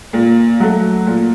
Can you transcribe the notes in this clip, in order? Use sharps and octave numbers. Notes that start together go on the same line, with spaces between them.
A#2
F#3 A3
A#2